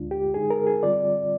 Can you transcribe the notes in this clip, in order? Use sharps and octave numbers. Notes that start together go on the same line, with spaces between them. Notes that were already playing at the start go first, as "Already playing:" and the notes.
Already playing: D2 D3 G#3 D4 F4
G4
D3 G#3 D#4 G#4
A#4
G#4
D3 G3 C4 F4 D5